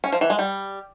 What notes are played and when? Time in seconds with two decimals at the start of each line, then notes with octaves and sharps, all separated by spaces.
0.04 C#4
0.12 F3
0.21 E3
0.30 G#3
0.39 G3